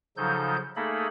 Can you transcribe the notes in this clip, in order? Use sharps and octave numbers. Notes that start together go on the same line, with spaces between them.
C#3 F3 F#3 D#4 A4 G6
A3 A#3 D#4 G#4 A4 B5